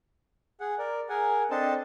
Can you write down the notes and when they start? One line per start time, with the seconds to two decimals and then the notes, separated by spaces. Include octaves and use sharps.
0.60 G#4 F#5
0.78 A#4 D5
1.09 G#4 A#4 F#5 G#5
1.51 C4 D4 A4 C5 D#5 A5